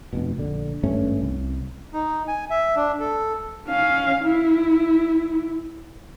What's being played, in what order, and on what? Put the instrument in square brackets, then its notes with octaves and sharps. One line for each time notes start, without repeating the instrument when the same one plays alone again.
[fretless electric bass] F1 B2
A#1 D3
G#1 G2 A3 C#4
C2
[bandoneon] D#4
G#5
E5
D4
A4
[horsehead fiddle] C#4 F5
E4